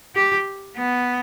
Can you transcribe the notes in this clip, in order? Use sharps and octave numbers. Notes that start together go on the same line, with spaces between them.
G4
B3